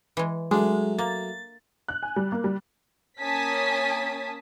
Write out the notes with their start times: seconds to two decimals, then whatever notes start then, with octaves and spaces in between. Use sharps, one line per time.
0.17 E3 G#3
0.51 F#3 G#3 A3 D4
0.99 A#3 A6
1.88 F#6
2.03 G#5
2.16 G3
2.32 A#3
2.44 G3
3.19 A#3 C#4 G#5 A5 D#6 B6